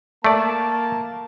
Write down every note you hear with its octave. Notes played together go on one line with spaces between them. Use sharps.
A3 A#3 D5 A5